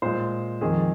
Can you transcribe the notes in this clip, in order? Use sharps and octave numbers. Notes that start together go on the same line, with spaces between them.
A#2 G#3 C5
F2 D#3 G#3 G#4